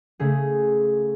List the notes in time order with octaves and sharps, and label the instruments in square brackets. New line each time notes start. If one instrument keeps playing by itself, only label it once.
[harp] C#3 A3 G#4